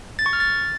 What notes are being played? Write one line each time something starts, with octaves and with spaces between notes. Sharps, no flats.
A6
C#6
F6
A6